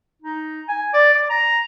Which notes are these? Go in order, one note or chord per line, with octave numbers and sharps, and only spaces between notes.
D#4
G#5
D5
D5
A#5